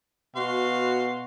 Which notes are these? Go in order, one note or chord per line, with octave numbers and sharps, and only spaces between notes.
B2 F#4 F5 C6